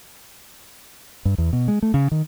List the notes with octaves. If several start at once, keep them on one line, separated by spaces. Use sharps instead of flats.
G2
E2
B2
G#3
A3
C#3
D#3